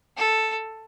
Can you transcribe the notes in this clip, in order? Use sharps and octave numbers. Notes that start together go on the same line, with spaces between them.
A4